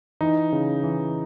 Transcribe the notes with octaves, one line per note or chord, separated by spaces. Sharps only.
E3 D#4
C#3
E3